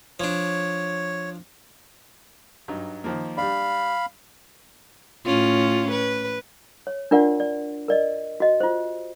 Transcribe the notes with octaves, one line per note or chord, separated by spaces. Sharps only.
F3 D4 C#5
G2 F#3 D#4
D#3 F3 A#3
G3 D4 F5 B5
A2 C#4 F4
B4
C#5
D4 F4 A#4 D5 F#5 C6
D5
A#4 D5 D#5
F#4 D#5
F4 C5